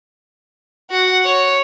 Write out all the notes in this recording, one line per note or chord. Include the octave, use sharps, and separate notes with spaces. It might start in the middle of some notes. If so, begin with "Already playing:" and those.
F#4 F#5
C#5